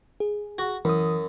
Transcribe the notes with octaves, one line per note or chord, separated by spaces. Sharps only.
G#4
F#4
F#2 E3 D#6